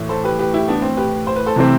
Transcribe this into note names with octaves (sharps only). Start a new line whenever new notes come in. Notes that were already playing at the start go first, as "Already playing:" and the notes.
Already playing: A2 E3
A4 C5
G4 B4
G4 B4
E4 G4
B3 D4
C4
G4 B4
C5
B4
A4 C5
C3 E3 A3 C4